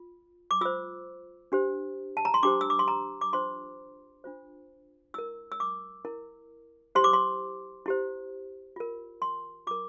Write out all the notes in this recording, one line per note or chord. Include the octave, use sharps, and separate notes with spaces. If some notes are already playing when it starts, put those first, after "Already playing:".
Already playing: F4
D6
F4 C5 E6
D4 G4 C5
A5
A#5
C6
D4 G4 C5 D6
E6
D6
C6
A#5
D6
D4 F4 C5 C6
D4 F4 C5
E4 A#4 E6
E6
D6
E4 A#4
E4 G4 C5 C6
D6
C6
E4 G4 C5
F4 A#4
C6
F4 A#4 D6